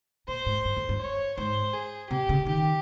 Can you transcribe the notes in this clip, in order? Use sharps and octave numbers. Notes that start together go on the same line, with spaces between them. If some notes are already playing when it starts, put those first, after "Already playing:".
A#2 C5
G#2
G2
F2
G2
C#5
G#2 C5
G#4
C3 G4
C#3
D#3 G4